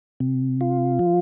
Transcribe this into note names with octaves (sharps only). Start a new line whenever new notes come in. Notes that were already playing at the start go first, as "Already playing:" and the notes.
C3
F4
F3